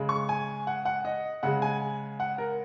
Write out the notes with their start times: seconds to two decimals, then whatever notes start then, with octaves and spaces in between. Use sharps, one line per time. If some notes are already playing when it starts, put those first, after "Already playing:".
Already playing: C#3 G#3
0.09 C#6
0.29 G#5
0.67 F#5
0.85 F#5
1.05 D#5
1.43 C#3 G#3 F#5
1.62 G#5
2.20 F#5
2.38 A#4